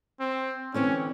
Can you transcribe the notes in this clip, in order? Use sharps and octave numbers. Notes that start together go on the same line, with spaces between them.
C4
D3 E3 C4 C#4